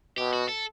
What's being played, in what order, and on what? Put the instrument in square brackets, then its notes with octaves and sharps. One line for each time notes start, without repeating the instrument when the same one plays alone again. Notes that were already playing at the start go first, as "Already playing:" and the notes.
[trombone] B2 [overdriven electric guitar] G4
[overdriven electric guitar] F#4
A4